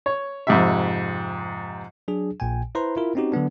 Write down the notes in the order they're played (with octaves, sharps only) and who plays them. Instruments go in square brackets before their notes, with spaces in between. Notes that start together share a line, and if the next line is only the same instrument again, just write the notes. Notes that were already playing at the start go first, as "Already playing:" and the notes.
[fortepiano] C#5
F2 G#2 C3 E5
[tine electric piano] F#3 D4 G#4
A#1 A#2 G5 G#5
E4 B4 C5 A#5 C6
E4 F4 A#4
C4 C#4 D#4 F#4 G4
D3 F#3 B3 D4